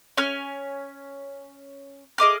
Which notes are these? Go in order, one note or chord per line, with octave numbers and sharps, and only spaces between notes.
C#4 G#5 F6
G#4 D#5 D6 F6